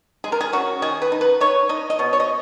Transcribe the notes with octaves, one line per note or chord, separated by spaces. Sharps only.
G#3 G#4
A#4
G#4
C#4 F#4
D#3 G#4
B4
D#4
B4
D#4 C#5
D#4 D#5
D#5
B2 C#5
C#5
D#5